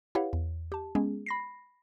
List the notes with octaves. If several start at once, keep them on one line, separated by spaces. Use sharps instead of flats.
E4 G4 B4 C#5 F5 F#5
E2
G4 A5
G#3 B3 C#4 G#4
B5 A#6 C7